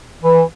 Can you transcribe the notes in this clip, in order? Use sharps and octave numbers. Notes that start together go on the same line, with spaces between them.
E3